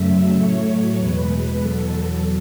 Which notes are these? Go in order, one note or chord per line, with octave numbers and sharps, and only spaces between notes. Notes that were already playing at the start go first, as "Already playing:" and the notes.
Already playing: F#2 C#3 F#3 A3 E5
A2 F#3 A3 C#5
E2 B2 G#3 B4
E2 B2 F#3 A4